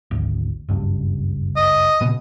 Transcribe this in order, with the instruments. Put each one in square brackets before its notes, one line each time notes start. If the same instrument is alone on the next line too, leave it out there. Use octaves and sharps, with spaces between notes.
[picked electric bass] G#1 D2
F#1 C#2 G2
[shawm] D#5
[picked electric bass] A#2 C#3 B3